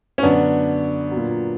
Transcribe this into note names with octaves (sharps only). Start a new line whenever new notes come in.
C#4
F#2 D3 F#3 B3 D4
A#2 F#3